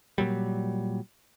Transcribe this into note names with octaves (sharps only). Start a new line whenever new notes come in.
A#2 F#3 G3